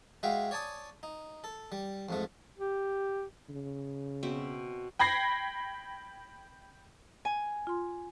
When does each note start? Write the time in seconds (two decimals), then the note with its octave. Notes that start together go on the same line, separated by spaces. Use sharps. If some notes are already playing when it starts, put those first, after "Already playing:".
0.23 G#3 F#4 E5 F5 G5
0.51 C#5 D5 G#5 A5 D#6
1.03 D#4
1.44 A4
1.72 G3
2.09 F2 G#2 A3
2.58 G4
3.49 C#3
4.23 B2 C4 E5
4.99 G5 B5 G#6 A#6 C7
7.25 G#5
7.67 F4 C6